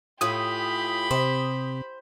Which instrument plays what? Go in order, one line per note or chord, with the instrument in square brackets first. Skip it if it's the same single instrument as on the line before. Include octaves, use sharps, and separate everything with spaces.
[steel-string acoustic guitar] A2 F4 G#5 [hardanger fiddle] G4 B5 [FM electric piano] D#6
[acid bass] C3 [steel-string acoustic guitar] C5